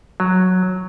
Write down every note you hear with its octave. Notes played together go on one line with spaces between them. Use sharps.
F#3